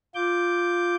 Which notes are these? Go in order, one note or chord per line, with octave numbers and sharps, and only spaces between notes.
F4 D6 G6